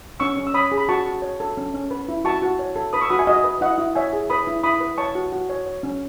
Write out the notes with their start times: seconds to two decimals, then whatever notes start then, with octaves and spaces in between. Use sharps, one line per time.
0.20 C#4 C#6 E6
0.37 C#4
0.47 E6
0.54 C#5 B5 D#6
0.72 G#4
0.77 B5
0.89 F#4 A5 C#6
1.05 F#4
1.22 C#5
1.40 A4
1.57 C#4
1.74 C#4
1.91 B4
2.08 E4
2.24 F#4 A5 C#6
2.42 F#4
2.59 C#5
2.76 A4
2.93 B4 B5 D#6
3.01 C#6 E6
3.10 F#4 B5 D#6
3.19 E5 G#5
3.27 F#4 D#5
3.44 B4
3.61 E4 D#5 F#5
3.78 E4
3.95 C#5 E5 G#5
4.13 G#4
4.30 B4 B5 D#6
4.47 E4
4.63 E4 B5 D#6
4.81 B4
4.98 C#5 A5 C#6
5.15 F#4
5.32 F#4
5.50 C#5
5.66 C#5
5.83 C#4